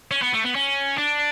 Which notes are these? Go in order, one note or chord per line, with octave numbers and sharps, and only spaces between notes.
C#4
B3
A3
B3
C#4
D4